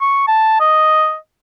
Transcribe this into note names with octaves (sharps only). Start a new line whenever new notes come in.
C#6
A5
D#5